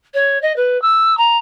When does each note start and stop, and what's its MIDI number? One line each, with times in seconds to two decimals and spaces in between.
0.14 0.40 73
0.42 0.55 75
0.56 0.80 71
0.82 1.16 88
1.17 1.37 82